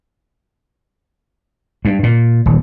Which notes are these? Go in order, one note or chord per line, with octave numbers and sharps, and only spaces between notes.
G2
A#2
D#1